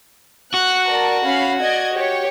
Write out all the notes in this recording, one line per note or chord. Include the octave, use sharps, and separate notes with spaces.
F#4 F#6
A#4 D5 A5
C#4 F5 B5
D5 D#5 G#6
G4 C#5